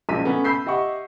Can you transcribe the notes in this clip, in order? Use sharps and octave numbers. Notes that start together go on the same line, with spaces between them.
A#1 F#2 G#3 A#5 B6 D#7
A3 B3 C#4
B5 E6 G6 B6 C7
G4 D#5 E5 F#5 C#6